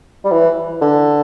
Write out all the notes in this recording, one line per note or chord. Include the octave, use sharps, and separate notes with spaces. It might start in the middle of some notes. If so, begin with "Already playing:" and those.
G3
E3
D3